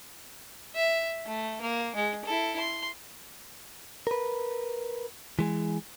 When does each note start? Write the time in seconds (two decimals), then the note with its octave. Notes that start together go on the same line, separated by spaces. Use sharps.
0.75 E5
1.25 A3
1.61 A#3
1.95 G#3
2.25 E4 A4
2.59 C6
4.07 A#4 B4
5.39 E3 G#3 G#4